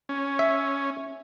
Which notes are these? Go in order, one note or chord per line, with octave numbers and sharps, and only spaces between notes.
C#4
E5